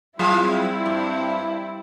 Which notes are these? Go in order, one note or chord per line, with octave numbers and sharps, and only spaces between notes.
F#3 G3 C4 E4 F4 G#4
G2